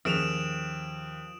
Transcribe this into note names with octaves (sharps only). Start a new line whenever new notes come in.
D#2 F3 C#4 G#4 D#6 D7 E7 F7